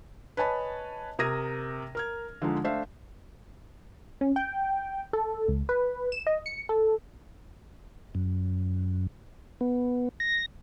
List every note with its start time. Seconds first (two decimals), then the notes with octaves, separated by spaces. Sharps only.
0.37 B4 C#5 D#5 G#5 A5 B5
1.19 C3 A#4 D#6 G#6 A#6 D#7
1.95 A#4 F6 G#6
2.42 D3 F3 G#3 D#4
2.64 A3 D4 C5 E5 F5
4.21 C#4
4.36 G5
5.13 A4
5.48 C#2
5.69 B4
6.12 E7
6.27 D#5
6.46 C#7
6.69 A4
8.15 F#2
9.61 B3
10.20 A#6